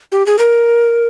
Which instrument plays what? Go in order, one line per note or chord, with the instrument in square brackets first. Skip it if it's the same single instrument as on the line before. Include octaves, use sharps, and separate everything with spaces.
[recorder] G4
G#4
A#4